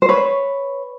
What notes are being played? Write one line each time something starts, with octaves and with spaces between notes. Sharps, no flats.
C5
B4 C#5